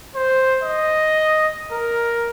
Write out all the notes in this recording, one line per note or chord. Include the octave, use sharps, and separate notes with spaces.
C5
D#5
A#4